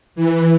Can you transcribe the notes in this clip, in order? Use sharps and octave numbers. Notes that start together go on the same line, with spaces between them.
E3